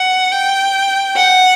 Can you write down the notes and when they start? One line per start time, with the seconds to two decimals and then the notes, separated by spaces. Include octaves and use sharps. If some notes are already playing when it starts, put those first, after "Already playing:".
Already playing: F#5
0.32 G5
1.16 F#5